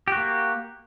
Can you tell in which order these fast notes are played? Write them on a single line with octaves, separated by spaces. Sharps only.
G4 F#4 A#3